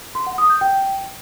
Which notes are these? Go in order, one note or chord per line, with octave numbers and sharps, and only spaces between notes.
C6
F#5
D#6
G6
G5